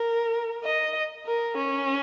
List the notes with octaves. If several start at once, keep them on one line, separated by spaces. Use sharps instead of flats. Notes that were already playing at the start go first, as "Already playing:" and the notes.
Already playing: A#4
D#5
A#4
C#4